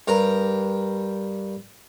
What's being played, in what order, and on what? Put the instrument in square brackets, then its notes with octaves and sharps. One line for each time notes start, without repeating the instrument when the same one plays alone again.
[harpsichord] G2 A#4 A#5